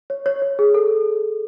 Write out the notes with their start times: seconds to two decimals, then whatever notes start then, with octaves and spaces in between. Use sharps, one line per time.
0.10 C#5
0.26 C#5
0.42 C#5
0.59 G#4
0.74 A4